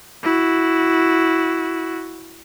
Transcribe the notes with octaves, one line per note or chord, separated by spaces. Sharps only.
E4 F#4